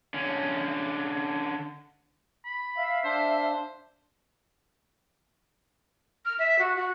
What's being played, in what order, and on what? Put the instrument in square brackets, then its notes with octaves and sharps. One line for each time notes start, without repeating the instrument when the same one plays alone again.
[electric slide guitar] D3 C#4
[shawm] B5
[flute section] E5 F5
[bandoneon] D4 [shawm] C5
[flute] F6
E5
F#4
F#4